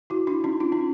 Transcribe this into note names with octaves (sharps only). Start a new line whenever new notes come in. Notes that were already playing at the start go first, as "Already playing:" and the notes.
E4 F#4
D4 E4
C#4 D#4
D#4 F4
C#4 D#4